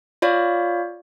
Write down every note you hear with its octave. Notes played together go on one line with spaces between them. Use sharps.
F4 C#5 D5 F5